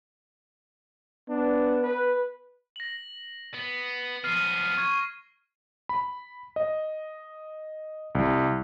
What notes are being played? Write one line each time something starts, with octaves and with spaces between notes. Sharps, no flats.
B3 D4
B4
A#6 F#7
B3
F3 B3 F6 C7 D#7
C#6 G#6
B5
D#5
C2